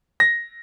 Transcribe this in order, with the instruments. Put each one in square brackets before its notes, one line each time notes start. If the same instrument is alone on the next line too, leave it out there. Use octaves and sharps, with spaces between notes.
[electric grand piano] A#6